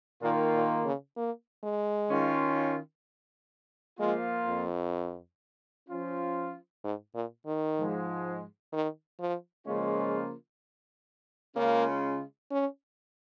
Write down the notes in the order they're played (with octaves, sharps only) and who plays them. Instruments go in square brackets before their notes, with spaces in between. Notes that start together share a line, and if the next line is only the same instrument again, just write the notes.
[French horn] A#2 [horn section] D#3 A#3 F4
[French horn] A#2
C#3
A#3
G#3
[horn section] D#3 C#4 F4
[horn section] F3 A#3 F4 [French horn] G#3
[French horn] F2
[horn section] F3 C#4 F4
[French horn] G#2
A#2
D#3
[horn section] G#2 F3 G#3
[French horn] D#3
F3
[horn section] C#3 F3 A#3 C#4 F4 [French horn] G#3
[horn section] C#3 G#3 C#4 F4 [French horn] A#3
[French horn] C#4